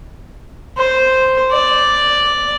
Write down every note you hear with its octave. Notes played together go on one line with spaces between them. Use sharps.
C5
D5